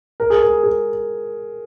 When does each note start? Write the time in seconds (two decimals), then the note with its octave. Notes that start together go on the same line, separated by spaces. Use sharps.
0.20 A#4
0.30 G#4
0.42 A#4
0.63 G#4